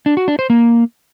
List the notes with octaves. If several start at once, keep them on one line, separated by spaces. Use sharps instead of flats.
D4
F#4
D4
C5
A#3